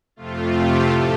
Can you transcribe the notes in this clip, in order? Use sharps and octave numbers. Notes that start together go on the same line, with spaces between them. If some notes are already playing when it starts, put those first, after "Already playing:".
F2 C3 A3 F4
G4
A2 A4